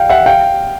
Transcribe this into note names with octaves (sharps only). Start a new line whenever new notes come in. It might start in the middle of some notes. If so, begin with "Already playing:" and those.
Already playing: F5 G5
E5 F#5
F5 G5